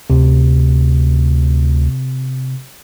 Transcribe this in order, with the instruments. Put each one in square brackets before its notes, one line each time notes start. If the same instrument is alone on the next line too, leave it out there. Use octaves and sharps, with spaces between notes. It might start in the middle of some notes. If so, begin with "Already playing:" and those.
[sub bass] D2 [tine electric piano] C3